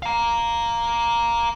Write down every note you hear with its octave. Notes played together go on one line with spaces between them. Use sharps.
F5 A#5